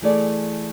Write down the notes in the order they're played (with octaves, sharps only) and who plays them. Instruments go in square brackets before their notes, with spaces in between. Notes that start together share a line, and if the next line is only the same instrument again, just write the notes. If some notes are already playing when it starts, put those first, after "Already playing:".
[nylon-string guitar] E3 A3 E4 G#4 D5